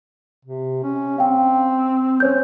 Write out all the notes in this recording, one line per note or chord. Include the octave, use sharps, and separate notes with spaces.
C3
C#4
C4 F5 G5
C#4 C5 C#5 G6